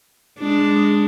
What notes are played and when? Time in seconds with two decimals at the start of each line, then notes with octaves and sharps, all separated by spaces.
0.39 G#3 D4